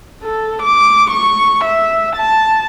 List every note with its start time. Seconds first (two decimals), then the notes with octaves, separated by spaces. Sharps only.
0.23 A4
0.63 D6
1.11 C#6
1.64 E5
2.16 A5